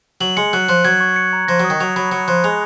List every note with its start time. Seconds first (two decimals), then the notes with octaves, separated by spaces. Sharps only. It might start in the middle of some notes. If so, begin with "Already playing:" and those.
0.21 F#3 F#7
0.37 G#3 C#7
0.53 F#3 F#6
0.69 F3 F#6
0.85 F#3 G#6
1.00 C#6
1.16 C#7
1.33 A#5
1.48 F3 A#6
1.60 F#3
1.64 D#6
1.70 D#3
1.81 F#3 F7
1.96 F#3 B5
2.12 F#3 C#7
2.28 F3 F#6
2.44 G#3 F7